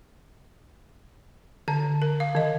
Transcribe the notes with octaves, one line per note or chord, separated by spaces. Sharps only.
D3 A5
A#4
F5
D#3 D#5